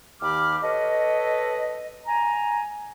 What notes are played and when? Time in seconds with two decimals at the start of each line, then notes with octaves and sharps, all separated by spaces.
0.22 D#2 D#3 G4 B5 D6 F6
0.63 A4 B4 C#5 D#5
2.07 G#5 A#5